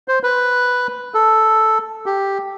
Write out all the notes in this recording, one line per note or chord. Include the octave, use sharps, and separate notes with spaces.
C5
B4
A4
G4